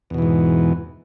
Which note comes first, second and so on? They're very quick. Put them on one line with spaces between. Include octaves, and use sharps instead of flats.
E2 B2 E3 G#2